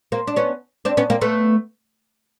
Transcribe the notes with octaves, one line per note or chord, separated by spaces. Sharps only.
A#3 C4
D4
B3 C#4
C4 D4
B3 C#4
A#3 C4
A3 B3